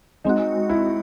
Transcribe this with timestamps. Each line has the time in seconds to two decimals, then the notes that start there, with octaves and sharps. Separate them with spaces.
0.24 G#3 C4 D#4 F#4
0.70 E4